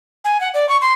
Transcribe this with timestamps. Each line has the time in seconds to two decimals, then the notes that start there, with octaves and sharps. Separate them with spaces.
0.24 G#5
0.40 F#5
0.54 D5
0.69 C#6
0.81 C6